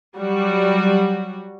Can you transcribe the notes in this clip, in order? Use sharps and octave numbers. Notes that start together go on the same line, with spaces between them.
F#3 G3 F#4